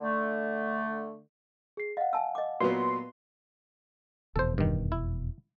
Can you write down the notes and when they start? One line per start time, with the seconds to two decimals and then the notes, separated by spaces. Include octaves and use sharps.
0.01 D3 A3
1.77 G#4 C7
1.97 D#5 F5 F#5
2.13 G#5 A5 E6
2.35 D#5 D6
2.60 A#2 F#3 B3 F#4 B4 D5 C6
4.36 F1 E2 B2 A4 C5
4.58 G2 D#3
4.92 E4